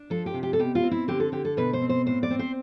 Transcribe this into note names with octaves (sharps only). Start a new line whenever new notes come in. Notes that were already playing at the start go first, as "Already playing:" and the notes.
Already playing: D4
F3 A4
G4
C3
G4
A4
B2 G4
F4
C4
E4
D3 G4
A4
D3 G4
A4
B2 B4
C5
C4
C5
A2 C5
D5
C4
C5